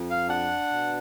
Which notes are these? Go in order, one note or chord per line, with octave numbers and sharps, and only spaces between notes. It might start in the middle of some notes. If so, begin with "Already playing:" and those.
Already playing: F2
F5
D4 F#5
B2